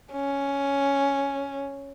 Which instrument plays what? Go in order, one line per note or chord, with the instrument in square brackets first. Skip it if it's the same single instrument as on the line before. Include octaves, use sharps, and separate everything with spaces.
[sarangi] C#4